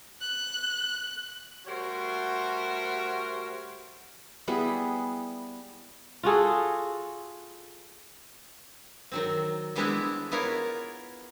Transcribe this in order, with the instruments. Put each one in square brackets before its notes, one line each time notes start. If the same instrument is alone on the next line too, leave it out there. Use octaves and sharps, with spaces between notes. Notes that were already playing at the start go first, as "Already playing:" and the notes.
[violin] F#6
[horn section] G3 A3 F#4 A#4 C5 C#5
[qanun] G3 B3 E4 G#4
[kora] F4 F#4 G#4 A4
[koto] D#3 F#3 C4
G3 G#3 B3 C4 D4 E4
B3 E4 F4 A#4 C#5